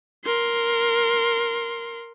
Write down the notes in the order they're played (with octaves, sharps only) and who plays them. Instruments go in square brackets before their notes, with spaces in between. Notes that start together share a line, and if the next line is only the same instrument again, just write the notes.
[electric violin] A#4 C6